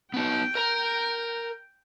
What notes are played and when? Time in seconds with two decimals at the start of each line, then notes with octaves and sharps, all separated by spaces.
0.14 B3 D#4 G5
0.55 A#4 A#5